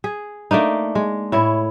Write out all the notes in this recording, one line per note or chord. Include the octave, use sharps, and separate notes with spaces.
G#4
A3 A#3 D4 D#4
G#3
A2 E4 C#5